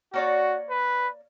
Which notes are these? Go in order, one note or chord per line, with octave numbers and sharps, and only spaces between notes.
A#3 F#4 C#5 D5
B4